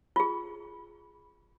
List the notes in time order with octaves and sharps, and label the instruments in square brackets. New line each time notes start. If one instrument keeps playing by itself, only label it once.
[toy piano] F4 G#4